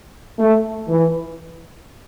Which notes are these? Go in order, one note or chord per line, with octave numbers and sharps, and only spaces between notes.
A3
E3